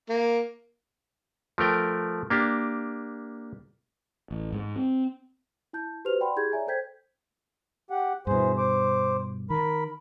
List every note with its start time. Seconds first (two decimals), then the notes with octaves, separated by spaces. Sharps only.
0.09 A#3
1.58 F3 A3 A#4 G5
2.30 A#3 D4 G4
4.31 A1
4.53 G#2
4.76 C4
5.73 E4 A5 G6
6.05 F#4 G4 B4 C5 F6 F7
6.20 D5 F#5 G5 B5 C6
6.36 E4 G4 G#4 G6 G#6
6.52 C#5 D5 E5 G#5 A#5
6.67 A4 C5 G5 G6 G#6 B6
7.90 G4 F#5
8.27 G2 B2 E3 G#4 C5
8.58 C5 D6
9.50 D#3 A#4 B5